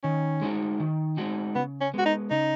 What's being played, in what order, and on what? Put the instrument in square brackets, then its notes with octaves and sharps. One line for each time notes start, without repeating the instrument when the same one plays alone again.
[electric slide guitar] D#3 [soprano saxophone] C#4
[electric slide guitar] G#3 D#4 F#4
D#3
G#3 D#4 F#4
[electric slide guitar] C#3 [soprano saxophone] B3
[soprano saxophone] C#4
[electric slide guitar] G#3 B3 [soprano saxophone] F#4
[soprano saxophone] D#4
[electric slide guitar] C#3 [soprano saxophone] D#4